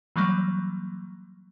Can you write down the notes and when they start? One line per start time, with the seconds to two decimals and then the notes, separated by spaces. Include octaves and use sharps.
0.16 E3 F#3 G3 A#3